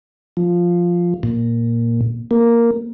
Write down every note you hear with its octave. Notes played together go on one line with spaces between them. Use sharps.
F3
A#2
A#3